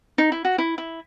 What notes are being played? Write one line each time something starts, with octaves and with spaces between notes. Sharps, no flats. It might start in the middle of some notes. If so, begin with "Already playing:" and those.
D#4
E4
F#4
E4
E4